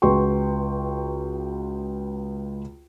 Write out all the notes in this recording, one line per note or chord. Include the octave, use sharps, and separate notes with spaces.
C#2 F#4 B4 G5 C6 C#6